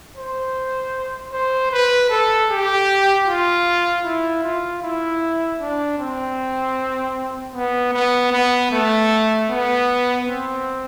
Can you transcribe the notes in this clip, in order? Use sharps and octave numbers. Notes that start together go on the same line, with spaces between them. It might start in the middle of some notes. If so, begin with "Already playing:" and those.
C5
C5
B4
A4
G4
F4
E4
F4
E4
D4
C4
B3
B3
B3
A3
B3
C4